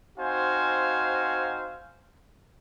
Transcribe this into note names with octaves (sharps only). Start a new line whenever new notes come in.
C4 D#4 F#4 C5 F5 G#5